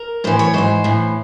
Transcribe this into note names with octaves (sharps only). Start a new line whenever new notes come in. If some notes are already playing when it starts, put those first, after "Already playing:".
Already playing: A#4
A2 E3 C5
C#5
G#2 E3 C5
A2 E3